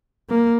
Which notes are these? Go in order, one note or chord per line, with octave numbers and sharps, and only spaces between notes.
A#3